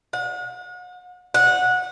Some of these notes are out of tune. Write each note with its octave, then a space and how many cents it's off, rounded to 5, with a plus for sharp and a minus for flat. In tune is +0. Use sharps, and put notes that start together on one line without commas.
F#5 -40
F#5 -20